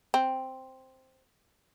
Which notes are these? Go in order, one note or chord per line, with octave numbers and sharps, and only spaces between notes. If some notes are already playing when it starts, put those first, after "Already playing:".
C4